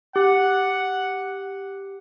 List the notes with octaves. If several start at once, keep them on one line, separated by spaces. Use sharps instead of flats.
G4 F#5